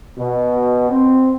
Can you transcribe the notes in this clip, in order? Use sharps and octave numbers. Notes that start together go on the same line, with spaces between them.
B2
C4